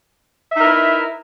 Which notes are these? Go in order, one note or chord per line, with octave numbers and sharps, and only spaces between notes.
D#4 E4 A#4 B4 E5